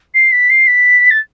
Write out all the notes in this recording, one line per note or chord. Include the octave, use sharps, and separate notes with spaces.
C7
B6
C7
B6
A6